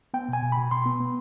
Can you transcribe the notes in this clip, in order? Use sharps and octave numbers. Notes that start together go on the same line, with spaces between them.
B3 G5
B2
G#5
B2
B2 B5
B2 C6
B3
B3